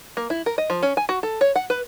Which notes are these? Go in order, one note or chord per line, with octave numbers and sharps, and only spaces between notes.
A#3
E4
A#4
D#5
F3
C#4
G#5
F#4
A4
C#5
F#5
B4